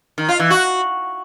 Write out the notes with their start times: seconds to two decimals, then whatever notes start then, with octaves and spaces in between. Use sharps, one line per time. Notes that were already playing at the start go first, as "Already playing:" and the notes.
0.18 D#3
0.29 F4
0.40 E3
0.50 F#4